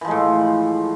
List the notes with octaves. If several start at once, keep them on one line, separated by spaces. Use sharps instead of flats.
A2 E3 F3 G#3